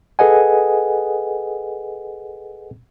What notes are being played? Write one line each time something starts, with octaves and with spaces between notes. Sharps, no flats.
G#4 A4 B4 D#5 F#5 G#5